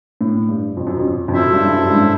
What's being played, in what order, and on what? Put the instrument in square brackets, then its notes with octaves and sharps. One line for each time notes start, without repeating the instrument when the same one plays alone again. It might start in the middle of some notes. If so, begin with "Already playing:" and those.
[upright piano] A2
G2
F2
F#2
F2
F2
[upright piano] F#2 [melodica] E4 A4 C5 E5
[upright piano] G2
G2
F#2
G2
G#2